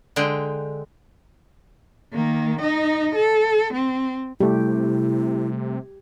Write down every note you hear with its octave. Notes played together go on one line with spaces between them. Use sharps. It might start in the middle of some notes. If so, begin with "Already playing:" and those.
D3 G#3 G5
D#3 A#3
D#4 D#5
A4
C4
C3 G3 A3 E4 G4